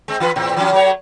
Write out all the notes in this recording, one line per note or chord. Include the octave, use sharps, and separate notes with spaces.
G#3 C4
E3 F4 B4
E2 A2 C4
E3 F#3 C#4
F#3 A3 C#5